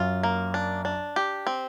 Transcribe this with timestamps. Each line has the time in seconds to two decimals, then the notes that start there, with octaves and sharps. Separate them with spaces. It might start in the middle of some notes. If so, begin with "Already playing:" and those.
Already playing: F#2 F4
0.23 A#3
0.54 D4
0.85 D4
1.16 G4
1.47 C4